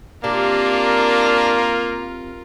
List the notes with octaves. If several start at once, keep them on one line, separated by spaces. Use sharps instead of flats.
C3 A#3 D4 F4 A#4